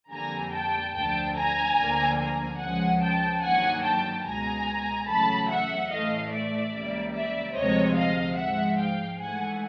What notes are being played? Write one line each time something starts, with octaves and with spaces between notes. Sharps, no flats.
F2 D3 G3 A#3 G#5 A#5
G5 A5
D2 D3 F3 G5 A5
G#5 A#5
D2 D3 F3 A#3
G#5 A#5
C#2 C#3 F3 G#3 F#5 G#5
G5 A5
G2 D#3 F#3 A#3 F#5 G#5
G5 A5
C#2 B2 G#3 G#5 A#5
E2 C#3 F#3 A3 A5 B5
E5 F#5
A2 E3 A3 D#5 F5
D5 E5
C#2 C#3 E3 G3 A#3
D5 E5
D2 C3 F3 G#3 C#5 D#5
D#5 F5
G#2 F3 G#3 E5 F#5
F5 G5
G#2 E3 A3 F#5 G#5